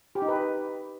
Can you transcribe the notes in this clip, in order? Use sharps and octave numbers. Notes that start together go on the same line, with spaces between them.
G4
D#4
B4